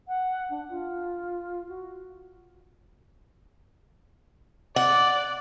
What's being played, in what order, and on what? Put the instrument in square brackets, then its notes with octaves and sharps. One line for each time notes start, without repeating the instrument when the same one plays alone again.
[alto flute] F#5
D4
F4
F#4
[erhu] D5 [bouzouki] F#5